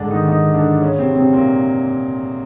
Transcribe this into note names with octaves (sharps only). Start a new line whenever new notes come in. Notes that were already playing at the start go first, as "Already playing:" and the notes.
Already playing: G#2 D3 G#3 D4
D#3 D#4
D#3 D#4
D3 D4
C#3 C#4
C3 C4
C3 C4
A#2 A#3